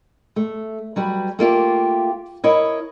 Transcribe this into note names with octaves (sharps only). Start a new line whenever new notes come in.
A3
F#3 G3 B4
A3 A#3 F4 G4
E4 A#4 C#5 D#5